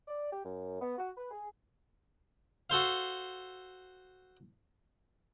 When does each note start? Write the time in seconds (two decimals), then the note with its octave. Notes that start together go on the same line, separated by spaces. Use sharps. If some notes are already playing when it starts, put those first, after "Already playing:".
0.08 D5
0.32 G4
0.44 F#2
0.81 B3
0.98 F#4
1.17 B4
1.31 G#4
2.70 F#4 A4 C5 F5